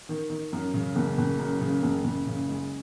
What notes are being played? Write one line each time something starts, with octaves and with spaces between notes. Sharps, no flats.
D#3
D#3
F#2
C#3
F#1
F#1
F#2
C#3
F#1
F#1
C#3
G#3